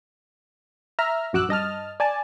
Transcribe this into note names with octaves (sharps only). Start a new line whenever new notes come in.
E5 A#5 F6
A#1 F#2 F#4 D6 E6 F#6
G2 D#5 A5 F6
D5 G#5 A5